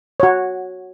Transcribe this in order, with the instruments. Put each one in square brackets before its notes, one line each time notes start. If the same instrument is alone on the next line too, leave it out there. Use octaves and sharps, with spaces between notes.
[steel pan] F#4 C#5